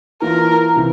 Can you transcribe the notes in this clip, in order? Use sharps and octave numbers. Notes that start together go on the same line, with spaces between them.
E3 A#3 F4 A#4
C3 E3